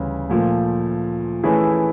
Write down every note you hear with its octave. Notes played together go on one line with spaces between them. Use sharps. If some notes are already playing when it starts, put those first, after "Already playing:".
Already playing: D2 C#3 E3 G3
A#2 F3 A3
E3 A3 C#4 E4 G#4